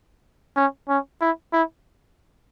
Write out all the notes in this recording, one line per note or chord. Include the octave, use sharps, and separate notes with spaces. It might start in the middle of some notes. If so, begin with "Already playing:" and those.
C#4
C#4
E4
E4